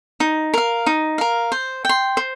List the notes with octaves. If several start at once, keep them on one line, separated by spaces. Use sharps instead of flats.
D#4
A#4 F5
D#4
A#4 F5
C5
G5 C6
C5